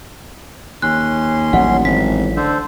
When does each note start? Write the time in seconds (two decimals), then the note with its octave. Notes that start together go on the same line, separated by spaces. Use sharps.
0.82 D#2 C#4 C6 F#6
1.53 D#1 A1 F#3 F#5
1.85 G#1 B6
2.37 D3 A4 C5